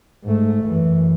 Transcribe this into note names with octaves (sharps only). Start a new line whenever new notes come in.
G#2 A3
F#2 E3